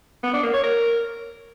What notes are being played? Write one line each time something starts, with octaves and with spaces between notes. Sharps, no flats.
B3
D4
A#3
C#5
A#4